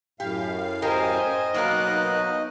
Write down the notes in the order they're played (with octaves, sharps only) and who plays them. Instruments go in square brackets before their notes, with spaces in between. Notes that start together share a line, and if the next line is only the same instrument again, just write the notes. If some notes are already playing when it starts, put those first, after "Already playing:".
[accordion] F#2 A2 F5 [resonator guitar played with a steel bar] G4
[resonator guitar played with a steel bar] G4 A#4 [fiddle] C5 G#5 [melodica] D#5
[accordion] B2 F#3 D#4 [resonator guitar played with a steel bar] A#3 B3 A#4 [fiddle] F5 F#6